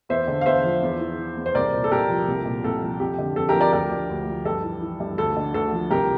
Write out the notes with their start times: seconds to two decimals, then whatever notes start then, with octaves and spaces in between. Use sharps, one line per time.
0.09 E2 C5 E5
0.28 D3
0.41 F5
0.46 E2 C5 E5
0.64 F3
0.82 E2
1.00 E3
1.18 E3
1.37 E2
1.46 C5
1.55 C2 A#4 D5
1.73 A#2
1.84 A4
1.91 C2 G4 A#4
2.09 F3
2.28 C2
2.45 A#2
2.64 C2 A4
2.83 F3
3.00 F2 G4
3.19 D3
3.36 F2 A4
3.49 G4 A#4
3.55 F3
3.61 A#4 D5
3.73 D2 G4 A#4
3.91 D3
4.10 D2
4.28 F3
4.45 G2 A4
4.64 E3
4.82 E3
5.00 G2
5.18 D2 A4
5.37 D3
5.54 D2 A4
5.72 F3
5.91 C2 G4 A#4